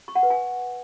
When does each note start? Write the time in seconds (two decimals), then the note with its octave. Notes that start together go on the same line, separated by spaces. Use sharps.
0.08 C#6
0.15 F#5
0.23 B4
0.30 G#5